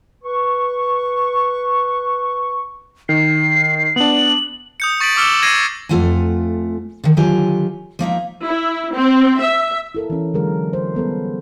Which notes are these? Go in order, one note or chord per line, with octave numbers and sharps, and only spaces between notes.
B4 C#6
D#3 C7
B3 D4 F#7
D#6 G6 C#7
C#6 A6 B6 D7 F#7
D6 E6 F6 C#7 E7 G7
G#6 A#6 C7 D#7
F2 G#2 A3 F4 F#5 G#5
D3 D#3
D3 D#3 F#3 F4 G4 G#5
F3 A#3 D#4 E5
E4
C4
E5
E4 A4 A#4
E3 C#4
D3 E3 F#3 G#3 G#4 A#4
C5
G3 B3 A4 B4